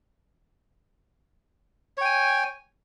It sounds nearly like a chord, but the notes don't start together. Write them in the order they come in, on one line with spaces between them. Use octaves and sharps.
C#5 G5 G#5